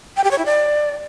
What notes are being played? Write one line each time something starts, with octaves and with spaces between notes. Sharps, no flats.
G5
G4
C#5
E4
D5